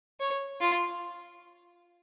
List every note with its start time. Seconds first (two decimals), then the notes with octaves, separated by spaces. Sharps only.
0.20 C#5
0.61 F4